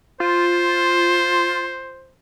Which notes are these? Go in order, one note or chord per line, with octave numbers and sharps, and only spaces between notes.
F4 C5